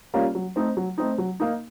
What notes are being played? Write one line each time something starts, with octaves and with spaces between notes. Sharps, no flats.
G3 A#3 C#4 F4
F#3
A3 C4 D#4
F#3
A3 C4 D#4
F#3
A#3 D#4